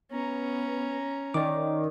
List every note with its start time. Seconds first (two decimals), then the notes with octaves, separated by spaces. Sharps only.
0.11 B3 C#4 A#5
1.34 D#3 C#5 D5 D6